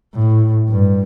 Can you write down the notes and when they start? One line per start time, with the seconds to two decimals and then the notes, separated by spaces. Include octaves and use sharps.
0.15 A2
0.69 G2